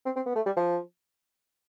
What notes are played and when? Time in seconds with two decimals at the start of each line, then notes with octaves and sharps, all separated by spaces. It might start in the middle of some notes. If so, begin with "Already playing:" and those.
0.05 C4
0.16 C4
0.26 B3
0.36 A3
0.46 G3
0.57 F3